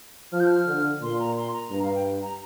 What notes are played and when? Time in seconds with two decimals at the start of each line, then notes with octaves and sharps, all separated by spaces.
0.32 F3 F6
0.40 G6
0.47 F6
0.67 D3
1.02 A#2 C6
1.20 A#5
1.36 C6
1.53 A#5
1.71 G2 A#5
1.82 F5
1.94 G5
2.22 A#5